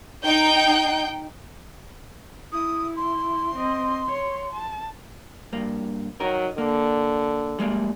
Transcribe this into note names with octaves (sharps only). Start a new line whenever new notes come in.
D#4 G5 G6
E4 D#6
C6
C4 D#5
C#5
A5
G2 A#3
F#3 D#4 A#4
D3 A#3
G3 G#3 A#3